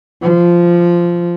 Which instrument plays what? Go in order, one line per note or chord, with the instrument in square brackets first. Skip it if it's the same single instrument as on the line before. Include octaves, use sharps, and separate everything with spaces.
[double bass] F3